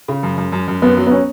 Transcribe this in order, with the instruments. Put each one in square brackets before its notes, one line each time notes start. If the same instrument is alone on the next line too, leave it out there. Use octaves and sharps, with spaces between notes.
[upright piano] C#3
F#2
F#2
F#2
F#2
[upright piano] F#2 [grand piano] B3
[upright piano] F#3
[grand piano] B3
C#4